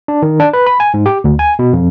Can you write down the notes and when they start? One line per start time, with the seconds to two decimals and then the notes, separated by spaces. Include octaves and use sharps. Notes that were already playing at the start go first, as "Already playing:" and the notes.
0.08 D4
0.23 D#3
0.40 D4
0.53 B4
0.67 B5
0.80 G#5
0.94 G#2
1.06 G4
1.24 D2
1.39 G#5
1.59 B2
1.73 F2